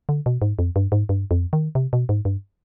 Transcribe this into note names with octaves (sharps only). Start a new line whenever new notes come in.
D3
B2
G#2
F2
G2
G#2
G2
F2
D#3
C3
B2
G#2
G2